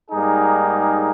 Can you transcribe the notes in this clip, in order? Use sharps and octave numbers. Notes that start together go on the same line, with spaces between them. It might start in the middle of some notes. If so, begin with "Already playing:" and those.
G#2 G3 A#3 D#4 G#4